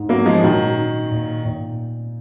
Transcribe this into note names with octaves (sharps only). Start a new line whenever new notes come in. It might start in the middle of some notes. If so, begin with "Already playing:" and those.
Already playing: G#2
F#3 A#3 C#4
F3 G#3
A#2 D#3 F#3
D#4
A#2
A#2